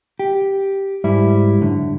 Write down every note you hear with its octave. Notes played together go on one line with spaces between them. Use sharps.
G4
G#2 G3 E4
F#2 D3